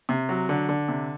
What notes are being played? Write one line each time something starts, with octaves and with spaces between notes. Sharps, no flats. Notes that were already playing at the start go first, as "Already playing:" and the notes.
C3
F#3
D3
D3
C3